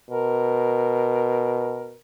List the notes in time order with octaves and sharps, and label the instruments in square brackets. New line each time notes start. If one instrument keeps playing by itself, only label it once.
[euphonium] B2 [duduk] A#4